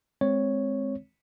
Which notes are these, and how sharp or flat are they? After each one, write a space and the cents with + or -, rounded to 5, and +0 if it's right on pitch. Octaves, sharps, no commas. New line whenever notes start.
G#3 +10 C4 +5 C#5 +0